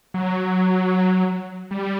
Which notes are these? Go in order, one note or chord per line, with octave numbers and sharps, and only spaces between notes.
F#3
G3